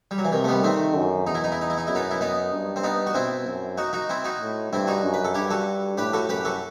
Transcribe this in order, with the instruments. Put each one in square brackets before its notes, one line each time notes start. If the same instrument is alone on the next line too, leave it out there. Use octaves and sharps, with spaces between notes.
[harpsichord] G3
F#3
E3
[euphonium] C3 [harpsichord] D#3
[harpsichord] A3
G3 B3
[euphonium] D#3 [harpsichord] A3 C4
[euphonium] F#2
[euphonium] E2 [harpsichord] D#4
[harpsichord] E4
D#4
E4
D#4
E4
D#4
[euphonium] F#2 [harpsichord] E4
[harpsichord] B3 D#4
E4
B3 D#4
[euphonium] G2
[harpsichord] C4
B3 D#4
F#4
[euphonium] B2 [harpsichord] C4 E4
[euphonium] F#2
[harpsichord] D#4 F#4
D#4 F#4
C4 E4
D#4 F#4
[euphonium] A2
[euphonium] G2 [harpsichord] C4 E4
[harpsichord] D#4 F#4
[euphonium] F#2
[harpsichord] B4
A4
[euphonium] G2 [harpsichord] E4 G4
[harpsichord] F#4 A4
[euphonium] A2 [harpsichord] G4 B4
[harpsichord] F#4 A4
[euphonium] F#2 [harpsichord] G4 B4
[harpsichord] F#4 A4